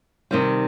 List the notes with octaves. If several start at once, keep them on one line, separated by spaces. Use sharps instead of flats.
C3 D#3 G3